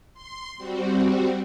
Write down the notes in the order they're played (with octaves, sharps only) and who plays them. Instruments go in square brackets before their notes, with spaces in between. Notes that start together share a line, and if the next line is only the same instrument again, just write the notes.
[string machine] C6
G3 C4 F#4